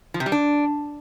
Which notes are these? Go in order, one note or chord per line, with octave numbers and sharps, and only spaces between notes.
F3
C3
G3
D4